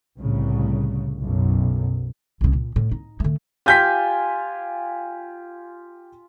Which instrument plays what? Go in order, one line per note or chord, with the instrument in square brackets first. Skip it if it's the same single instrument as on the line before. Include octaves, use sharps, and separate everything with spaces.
[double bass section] C2 A2 C#3
B1 F#2
[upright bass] C2 C#3
A#2
A2
D#4
D3 A3
[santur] F4 F5 G#5 [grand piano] G4 G6 B6